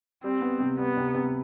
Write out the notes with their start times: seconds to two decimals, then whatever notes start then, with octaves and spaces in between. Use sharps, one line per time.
0.24 G3 C4
0.41 B3
0.60 C3
0.78 G3 B3
0.97 C3
1.15 C3